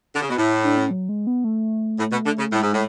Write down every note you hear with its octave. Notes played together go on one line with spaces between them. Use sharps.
D3
C#3
B2
A2 E4
D4
C#4
F#3
G#3
B3
A3
A2
B2
D3
C#3
A2 G#3
G#2
A2